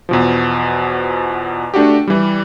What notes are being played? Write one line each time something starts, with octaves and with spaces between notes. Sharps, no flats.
E2 B2 F3
A3 D4 F#4 G4
E3 G3